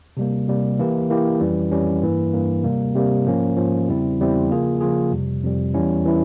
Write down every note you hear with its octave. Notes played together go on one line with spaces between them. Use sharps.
C3 G3 A#3
C3 G3 A#3
E3 A#3 E4 G4
E3 A#3 E4 G4
F2 E3 G3 C#4
F2 E3 G3 C#4
G2 E3 A#3
G2 E3 A#3
C3 G3 A#3
C3 G3 A#3
G#2 F3 A#3 C#4
G#2 F3 A#3 C#4
E2 C#3 G3 C4 E4
E2 C#3 G3 C4 E4
C#3 F3 A#3 F4 G#4
C#3 F3 A#3 F4 G#4
F2 C3 G3
F2 C3 G3
E2 E3 G3 C#4 E4
E3 G3 C#4 E4